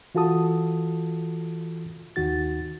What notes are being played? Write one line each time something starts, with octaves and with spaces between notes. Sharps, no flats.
E3 F4 F#4 A4 A5 D#6
D#2 D#3 F#4 A6